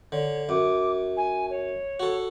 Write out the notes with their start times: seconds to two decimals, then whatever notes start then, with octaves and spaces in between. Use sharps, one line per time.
0.12 D3 C#5
0.49 F#2 D6
1.17 G#5
1.50 C#5
2.00 F#4 A4